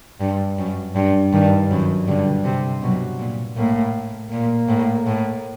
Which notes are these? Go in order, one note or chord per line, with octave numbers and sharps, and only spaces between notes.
G2
F#2
G2
G2 D#3
F#2 D#3
G2 D3
C3
B2 F#3
A#2
A2 A#3
A#2 A#3
A2
A2